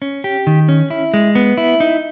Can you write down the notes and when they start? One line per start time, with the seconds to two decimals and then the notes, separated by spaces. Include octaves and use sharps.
0.02 C#4
0.24 G4
0.47 D#3
0.69 C#4
0.90 E4
1.14 G#3
1.35 B3
1.58 E4
1.80 D#4